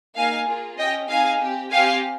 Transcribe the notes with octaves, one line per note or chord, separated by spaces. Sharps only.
A#3 D#4 G#4 F5 G#5
A#3 F4 G#4
C#4 G4 D#5 G5
C4 D#4 G#4 F5 G#5
C4 G4
C4 G4 F5 G#5